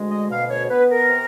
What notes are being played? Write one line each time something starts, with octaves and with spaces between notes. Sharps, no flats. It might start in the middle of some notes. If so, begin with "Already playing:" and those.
Already playing: D2 G#3
D#5
B2 F5
C#5
B3 B4
A#4
C3